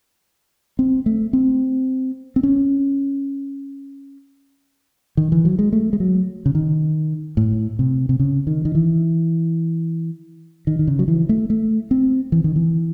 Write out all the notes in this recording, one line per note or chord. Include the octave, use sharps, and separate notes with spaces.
C4
A3
C4
C4
C#4
D#3
E3
F#3
G#3
A3
G#3
F#3
C#3
D#3
A2
C3
C3
C#3
D#3
D#3
E3
D#3
D#3
C#3
F#3
E3
A3
A3
C4
E3
D#3
E3